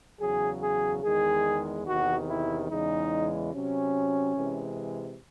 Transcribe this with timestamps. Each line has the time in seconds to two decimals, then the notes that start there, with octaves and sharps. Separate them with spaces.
0.20 E2 C#3 F#3 G#4
0.61 G#4
1.02 E2 D#3 G#3 G#4
1.86 E2 C3 D#3 F#4
2.28 E4
2.69 E2 C#3 E3 G#3 D#4
3.53 C3 F#3 C#4
4.35 C3 E3 G#3